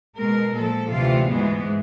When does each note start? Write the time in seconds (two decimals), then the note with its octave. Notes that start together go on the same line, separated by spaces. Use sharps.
0.17 B2 G#3 A#4
0.54 A#2 F3 G#3 A4
0.91 D2 C3 E3 A3 F4
1.28 G#2 E3 G#3 B3